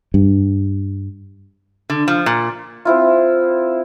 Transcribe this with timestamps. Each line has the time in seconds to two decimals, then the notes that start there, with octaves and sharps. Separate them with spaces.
0.14 G2
1.90 D3
2.08 F3
2.26 A#2
2.85 C4 E4 F4